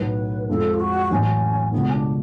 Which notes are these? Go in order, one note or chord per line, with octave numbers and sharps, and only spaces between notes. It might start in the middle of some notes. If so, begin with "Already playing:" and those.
Already playing: B1 A2 F#3 B4
F2 F3 G#3 A4
F4
F#4
A1 A2 F#3 C#4
C#2 B2 A3 B3
C#4
D4